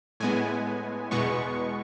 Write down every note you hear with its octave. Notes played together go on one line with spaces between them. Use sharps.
A2 G#3 B3 G#5
E2 B2 G#3 B3 C#6